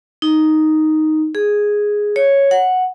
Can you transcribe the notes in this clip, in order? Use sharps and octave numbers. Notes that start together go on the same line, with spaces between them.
D#4
G#4
C#5
F#5